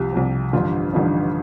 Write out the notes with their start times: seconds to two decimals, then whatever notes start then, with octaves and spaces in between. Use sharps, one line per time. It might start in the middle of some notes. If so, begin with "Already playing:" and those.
Already playing: C2 C3 F3 G4
0.12 C2 C3 F3
0.53 A1 G2 D3 F3 F4
0.93 A1 G2 D3 F3 D#4